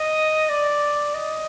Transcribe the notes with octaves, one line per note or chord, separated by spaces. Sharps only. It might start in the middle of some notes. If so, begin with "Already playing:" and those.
Already playing: D#5
D5
D#5